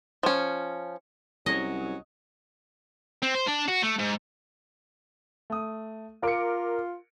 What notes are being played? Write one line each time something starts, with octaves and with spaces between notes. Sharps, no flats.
F3 C#4
C2 F#3 C#4 D#5
C4
C5
D4
F#4
A3
G#2
A3 D#6
F4 A#4 F5 D6 C#7 D7